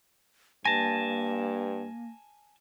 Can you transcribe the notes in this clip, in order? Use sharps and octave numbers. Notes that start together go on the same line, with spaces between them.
G2 A#3 G#5 A5 A#6